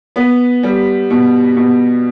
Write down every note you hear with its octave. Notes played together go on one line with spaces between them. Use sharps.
B3
G3
B2
B2